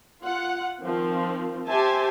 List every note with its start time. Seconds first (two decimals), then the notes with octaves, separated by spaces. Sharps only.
0.23 F4 F#5
0.82 D#3 F3 C4
1.67 G4 C5 E5 G#5 A5